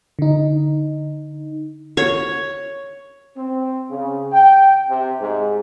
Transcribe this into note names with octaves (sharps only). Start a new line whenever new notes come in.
D3 D#4
C#5
C4
C#3
G5
C3
G#2